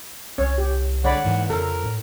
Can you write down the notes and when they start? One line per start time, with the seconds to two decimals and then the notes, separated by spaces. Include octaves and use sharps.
0.38 C2 C#4 C#5
0.58 G4
1.04 D3 G#3 C#5 D5 F#5 B5
1.25 G#2 E3 A#3
1.50 F2 C#3 A4 A#4
1.84 A2